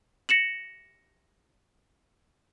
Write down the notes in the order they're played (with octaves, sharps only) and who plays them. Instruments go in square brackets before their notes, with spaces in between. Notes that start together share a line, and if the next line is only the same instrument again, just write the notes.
[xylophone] A#6 C#7 E7 F#7